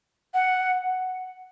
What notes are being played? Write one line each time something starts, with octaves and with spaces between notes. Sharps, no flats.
F#5